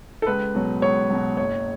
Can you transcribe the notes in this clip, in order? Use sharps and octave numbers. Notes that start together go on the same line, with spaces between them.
A4
C#2 B4
B2 F#3
C#2 C#5
B2 F#3
F#1 C#5